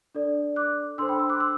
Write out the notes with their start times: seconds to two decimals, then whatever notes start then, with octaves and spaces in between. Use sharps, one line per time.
0.15 D4 A4 D5
0.56 D6 F#6
0.98 D4 A4 C5 C6 E6
1.09 G5 B5
1.19 C6 E6
1.29 D6 F#6
1.40 C6 E6